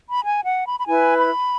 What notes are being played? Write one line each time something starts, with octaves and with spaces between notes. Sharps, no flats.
B5
G#5
F#5
B5
B5
E4 B4 G#5
B5